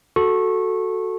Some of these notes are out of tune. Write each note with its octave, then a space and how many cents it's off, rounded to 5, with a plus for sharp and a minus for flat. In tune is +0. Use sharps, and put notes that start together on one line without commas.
F#4 +0 A4 +0 C#6 -20